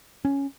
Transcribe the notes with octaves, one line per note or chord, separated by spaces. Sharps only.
C#4